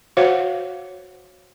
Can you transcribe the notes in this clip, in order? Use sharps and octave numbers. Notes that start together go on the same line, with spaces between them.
F#4 C5 C#5 F5 F#5